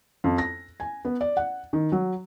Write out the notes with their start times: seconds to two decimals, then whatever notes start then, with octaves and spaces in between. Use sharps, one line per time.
0.24 F2
0.38 A#6
0.80 G#5
1.05 B3
1.21 D5
1.37 F#5
1.73 D#3
1.92 F#3